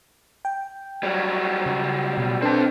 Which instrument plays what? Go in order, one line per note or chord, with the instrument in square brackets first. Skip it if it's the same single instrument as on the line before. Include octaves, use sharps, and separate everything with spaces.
[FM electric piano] G5
[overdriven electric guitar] F#3 G3
[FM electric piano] C#3
B2
[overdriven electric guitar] C4 A5 [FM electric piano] D4 A4 B4